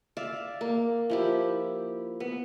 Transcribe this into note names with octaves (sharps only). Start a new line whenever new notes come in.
D5 E5 F5
A#3
F3 E4 G4
B3